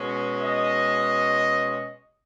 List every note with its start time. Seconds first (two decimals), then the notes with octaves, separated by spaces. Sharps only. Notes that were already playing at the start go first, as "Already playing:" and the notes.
Already playing: B2 G#3 C#4
0.42 D#5